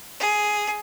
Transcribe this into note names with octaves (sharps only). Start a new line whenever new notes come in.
G#4